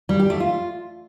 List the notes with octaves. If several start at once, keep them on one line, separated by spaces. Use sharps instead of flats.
G3
G4
A3
F4